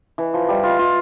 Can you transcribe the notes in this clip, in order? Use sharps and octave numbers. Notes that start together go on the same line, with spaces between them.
E3
F3
G3
F4
F4